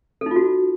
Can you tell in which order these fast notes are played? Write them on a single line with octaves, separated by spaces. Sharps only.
A4 D#4 F4 F#4